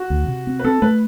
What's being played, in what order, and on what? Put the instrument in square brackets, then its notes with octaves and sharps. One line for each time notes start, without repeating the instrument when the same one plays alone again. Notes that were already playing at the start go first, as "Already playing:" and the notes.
Already playing: [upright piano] F#4
[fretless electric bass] D2
C3
C4
[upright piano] B4
[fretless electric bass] C4 [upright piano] A4
[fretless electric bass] A3 [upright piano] B4